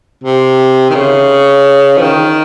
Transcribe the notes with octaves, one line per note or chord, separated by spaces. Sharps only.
C3
D#3
C#3
F3
D#3